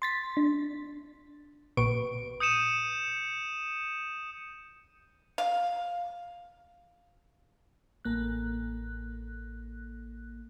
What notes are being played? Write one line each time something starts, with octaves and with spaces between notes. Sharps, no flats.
C6 A6 B6
D4
A#1 A#2 B4 C#6 D7
D#6 G6 C#7 D#7 E7
F5
A1 A#3 F#6